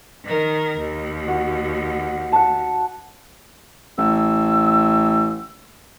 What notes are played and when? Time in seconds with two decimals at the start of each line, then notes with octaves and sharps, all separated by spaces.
0.23 D#3 A#4
0.78 D#2
1.28 F#4
2.32 F#5 A5
3.98 A1 E6